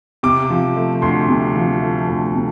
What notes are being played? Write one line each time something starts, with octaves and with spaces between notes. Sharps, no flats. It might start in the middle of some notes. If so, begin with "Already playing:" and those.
C3 D6
F3
A3
D2 C6
C3
F3
A3
D2
C3